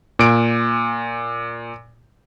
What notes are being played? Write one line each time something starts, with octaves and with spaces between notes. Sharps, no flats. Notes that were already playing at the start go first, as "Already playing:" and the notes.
A#2 D7